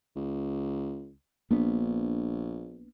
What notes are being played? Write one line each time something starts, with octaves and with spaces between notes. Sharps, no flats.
C#2
A#1 A#3 B3 D4